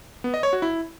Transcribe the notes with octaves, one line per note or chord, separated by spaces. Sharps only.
B3
D#5
C#5
F#4
E4